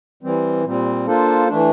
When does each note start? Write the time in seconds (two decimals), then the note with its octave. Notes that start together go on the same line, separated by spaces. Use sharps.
0.23 E3 G3 C4
0.64 A#2 G3 C4
1.06 A#3 D4 F4 A4 C5
1.48 E3 A3 D4